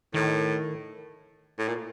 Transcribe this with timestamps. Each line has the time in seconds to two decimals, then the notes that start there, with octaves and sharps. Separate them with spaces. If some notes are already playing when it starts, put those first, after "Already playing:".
0.14 A2 D#3
1.59 A2
1.68 A#2